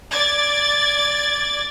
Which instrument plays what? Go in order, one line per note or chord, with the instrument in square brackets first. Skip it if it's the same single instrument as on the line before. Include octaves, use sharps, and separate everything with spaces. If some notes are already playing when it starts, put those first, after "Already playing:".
[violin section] D5 G#6 A6